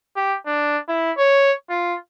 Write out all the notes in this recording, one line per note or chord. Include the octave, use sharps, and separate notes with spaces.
G4
D4
E4
C#5
F4